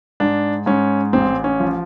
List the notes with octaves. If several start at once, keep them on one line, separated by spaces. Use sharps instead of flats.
G#2 D4
G#2 C#4
A1 C4
C#4
F3